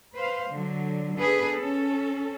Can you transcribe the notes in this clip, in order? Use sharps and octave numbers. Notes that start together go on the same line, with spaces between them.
B4 C5 F5
D3 F#3
B3 D4 G#4 A4 B4
C#4 A4